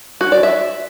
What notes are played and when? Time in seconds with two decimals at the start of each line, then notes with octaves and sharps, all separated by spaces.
0.21 F#4
0.32 D5
0.43 E5